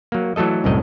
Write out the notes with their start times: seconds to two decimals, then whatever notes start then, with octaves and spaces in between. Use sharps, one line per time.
0.12 F#3 A#3
0.36 E3 F#3 A3 A4 D#5
0.64 C2 F#2 A2 D#5